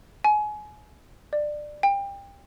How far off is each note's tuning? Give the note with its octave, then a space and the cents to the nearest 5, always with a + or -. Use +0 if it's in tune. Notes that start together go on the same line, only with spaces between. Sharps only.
G#5 +25
D5 +20
G5 +30